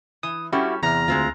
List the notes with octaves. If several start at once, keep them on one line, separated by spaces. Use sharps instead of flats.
E3 D#6
G3 C#4 E4 F#4 G4 A4
E2 C3 A#5 F6
D2 G#3 C4 F4